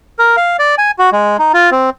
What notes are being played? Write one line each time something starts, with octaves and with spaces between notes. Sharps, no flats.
A#4
F5
D5
G#5
F#4
G#3
D#4
F4
C4